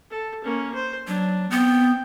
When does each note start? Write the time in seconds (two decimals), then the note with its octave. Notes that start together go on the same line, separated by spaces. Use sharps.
0.11 A4
0.44 A#3 C#4
0.75 C5
1.07 F#3 D4
1.51 B3 C4 G5